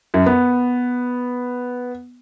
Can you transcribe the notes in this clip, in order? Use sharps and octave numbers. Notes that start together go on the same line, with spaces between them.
F#2
B3